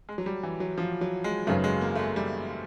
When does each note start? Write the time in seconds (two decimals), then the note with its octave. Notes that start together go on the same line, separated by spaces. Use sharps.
0.09 G#3
0.18 F#3
0.26 G3
0.43 E3
0.60 F#3
0.78 F3
1.01 F#3
1.24 G#3
1.47 G#1 F#2 C#3 F#3 A3 B3
1.64 G#3
1.81 A#3
1.95 A3
1.99 G#3
2.16 G3